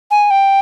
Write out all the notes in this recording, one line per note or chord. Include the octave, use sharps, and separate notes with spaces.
G#5
G5